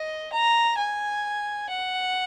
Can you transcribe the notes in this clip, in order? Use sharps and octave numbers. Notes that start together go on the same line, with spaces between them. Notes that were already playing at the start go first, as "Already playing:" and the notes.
Already playing: D#5
A#5
G#5
F#5